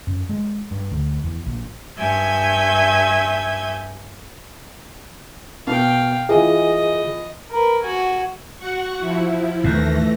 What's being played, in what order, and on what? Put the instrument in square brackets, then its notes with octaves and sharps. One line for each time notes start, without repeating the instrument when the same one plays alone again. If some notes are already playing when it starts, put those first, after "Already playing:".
[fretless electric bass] F#2
G#3
G2
D2
E2
A#1
[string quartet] G2 E5 G#5 G6 G#6
[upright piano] B2 [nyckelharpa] F5 G5
[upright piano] E3 F4 [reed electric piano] G#4 [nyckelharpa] D#5
[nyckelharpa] A#4 B4
F#4 G#5
[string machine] F#4 F#5 C#6
F3 E4
[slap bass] D#2 A2 [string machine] E3 A3 A#6